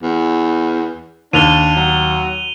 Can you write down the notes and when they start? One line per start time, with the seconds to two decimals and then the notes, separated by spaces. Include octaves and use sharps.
0.03 E2
1.33 D#2 D4 D#7 F7 G7
1.76 F#3